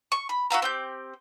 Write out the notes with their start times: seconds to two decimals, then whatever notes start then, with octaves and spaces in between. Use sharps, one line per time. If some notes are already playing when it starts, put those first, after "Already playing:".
0.12 C#6
0.29 B5
0.50 F#4 E5 F5 A#5
0.62 C4 G4 G6